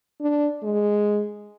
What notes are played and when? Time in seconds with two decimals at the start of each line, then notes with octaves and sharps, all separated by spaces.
0.21 D4
0.63 G#3